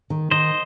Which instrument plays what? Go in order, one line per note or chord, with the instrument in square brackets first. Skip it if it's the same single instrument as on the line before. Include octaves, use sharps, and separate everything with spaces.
[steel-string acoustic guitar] D#3
[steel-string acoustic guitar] D#3 [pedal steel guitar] C5 D#5